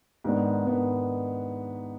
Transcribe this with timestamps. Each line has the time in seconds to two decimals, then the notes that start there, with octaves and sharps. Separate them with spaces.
0.24 G#2 D#3 B3 D4
0.65 G#2 D#3 B3 D4